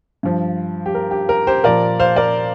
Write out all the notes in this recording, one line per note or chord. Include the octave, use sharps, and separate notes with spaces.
G2 F3
G4
A#4
G4
A#4
G4 C5
A#2 F3 A#4 D5
C5 F5
A#4 D5